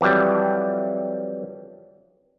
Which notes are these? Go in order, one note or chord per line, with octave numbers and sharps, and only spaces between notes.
F2 E3 F#3 G3